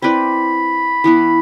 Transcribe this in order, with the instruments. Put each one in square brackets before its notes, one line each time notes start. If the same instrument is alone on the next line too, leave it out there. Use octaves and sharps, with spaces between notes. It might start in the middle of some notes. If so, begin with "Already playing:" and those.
[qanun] C4 E4 B4 D5 [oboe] B5
[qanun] E3 B3 E4